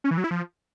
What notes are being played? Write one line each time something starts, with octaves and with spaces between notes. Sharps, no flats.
C#4
E3
F#3
E4
F3